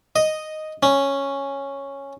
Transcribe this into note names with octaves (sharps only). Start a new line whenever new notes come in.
D#5
C#4